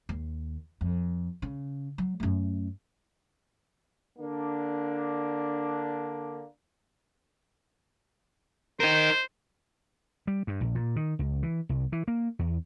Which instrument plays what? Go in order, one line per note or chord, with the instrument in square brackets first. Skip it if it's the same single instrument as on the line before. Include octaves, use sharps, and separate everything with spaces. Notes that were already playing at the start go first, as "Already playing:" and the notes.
[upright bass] D#2
F2
C#3
F#3
F#2 A3
[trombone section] D3 A#3 D4
[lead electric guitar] D#4 A#4 [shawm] C5
[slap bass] G3
G2
A#1
A#2
D#3
C#2
E3
C2
E3
A#3
E2